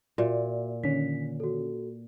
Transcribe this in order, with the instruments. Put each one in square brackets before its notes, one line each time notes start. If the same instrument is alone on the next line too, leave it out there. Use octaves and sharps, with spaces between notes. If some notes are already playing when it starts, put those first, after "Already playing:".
[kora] A#2 [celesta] F#4 D5 E5
[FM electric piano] D3 D#3 C#4 [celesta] B6
[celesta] F#4 A4